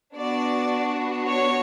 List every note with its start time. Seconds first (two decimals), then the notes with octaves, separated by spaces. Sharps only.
0.15 B3 D4 F#4 D5
1.24 C#5